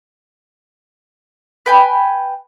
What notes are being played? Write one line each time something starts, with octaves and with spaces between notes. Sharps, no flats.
B4 G5 G#5